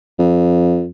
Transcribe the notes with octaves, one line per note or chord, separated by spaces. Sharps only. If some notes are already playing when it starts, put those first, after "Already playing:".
F2